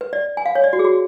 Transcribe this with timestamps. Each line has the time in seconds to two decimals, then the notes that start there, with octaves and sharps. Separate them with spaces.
0.01 B4
0.13 D5
0.37 G#5
0.46 F5
0.55 C#5
0.64 D5
0.73 F#4
0.79 G#4
0.85 F#4